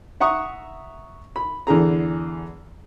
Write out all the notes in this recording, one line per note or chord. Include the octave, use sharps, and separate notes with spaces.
E5 F#5 A#5 C#6 D#6
B5
E2 D3 G#4 A#5